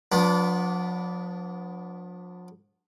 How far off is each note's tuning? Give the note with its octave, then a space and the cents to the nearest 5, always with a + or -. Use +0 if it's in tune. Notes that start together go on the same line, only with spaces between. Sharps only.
F3 +40 B3 +0 D4 -20